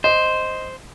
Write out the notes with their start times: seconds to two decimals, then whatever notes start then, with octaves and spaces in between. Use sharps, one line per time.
0.04 C5 D#5